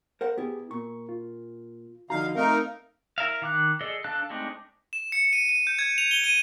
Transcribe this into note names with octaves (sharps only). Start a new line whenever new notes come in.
A#4 C5 F#5
B3 E4 G4 G#4
A#2 C#6
F4
D3 F3 D#4 F#4 D#5 F5 A#5
A3 C4 D#4 A#4 F5
E4 A#4 E5 F5
D#3 D6 F#6
G#4 A4 D5 D#5
D4 A4 F5 A5 F#6
G#3 A3 C4 D4 D#4
E7
C#7
D#7
D#7
G6
G#6
F7
G7
D#7